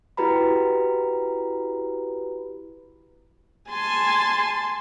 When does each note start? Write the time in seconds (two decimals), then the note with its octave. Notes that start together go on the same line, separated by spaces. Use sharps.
0.17 E4 F#4 G4 B4 A#5 B5
3.70 G#5 A5 C6